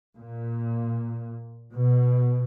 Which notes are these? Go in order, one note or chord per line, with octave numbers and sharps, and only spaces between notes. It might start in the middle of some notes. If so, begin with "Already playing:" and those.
A#2
B2